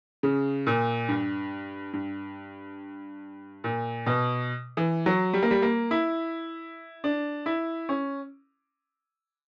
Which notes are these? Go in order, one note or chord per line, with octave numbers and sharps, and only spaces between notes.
C#3
A#2
G2
G2
A#2
B2
E3
F#3
G3
A#3
G3
A#3
E4
D4
E4
C#4